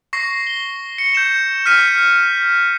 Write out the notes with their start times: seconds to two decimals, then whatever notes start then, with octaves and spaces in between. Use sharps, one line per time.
0.13 C#6 A#6 C7
0.47 G7
0.98 C#7
1.14 G6 E7
1.66 F6 B6 D#7